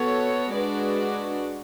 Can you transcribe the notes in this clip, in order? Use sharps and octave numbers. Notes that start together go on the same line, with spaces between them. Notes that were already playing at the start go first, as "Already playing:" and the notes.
Already playing: B3 F#4 A4 C#5
G#3 D4 F#4 B4 D5